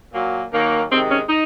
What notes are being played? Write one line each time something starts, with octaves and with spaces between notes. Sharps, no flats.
A#2 F#3 A#3
D#2 D#3 F#3 A#3
C3 D#3 G#3 C4
C#4
D#4